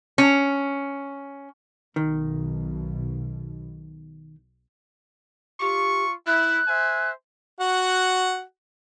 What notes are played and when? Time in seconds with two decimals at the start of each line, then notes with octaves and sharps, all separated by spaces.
0.18 C#4
1.96 B1 B2 D#3
5.60 F4 G4 C#6
6.27 E4 F#6
6.68 C5 E5 G#5
7.60 F#4 F#5